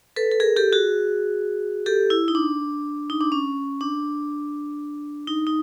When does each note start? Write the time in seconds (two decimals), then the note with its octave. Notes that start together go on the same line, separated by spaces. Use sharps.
0.16 A4 B4
0.31 A4
0.40 G#4 A#4
0.56 G4 A4
0.73 F#4 G#4
1.86 G4 A4
2.10 E4
2.28 D#4
2.35 D4
3.10 D#4
3.21 D4
3.32 C#4
3.81 D4
5.27 D#4
5.47 D#4